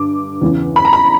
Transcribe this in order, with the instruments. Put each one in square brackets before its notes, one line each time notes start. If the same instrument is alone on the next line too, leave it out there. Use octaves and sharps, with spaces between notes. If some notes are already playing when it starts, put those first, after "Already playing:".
Already playing: [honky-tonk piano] G2 D3 D6
E2 C#3 E3
B5
A#5
B5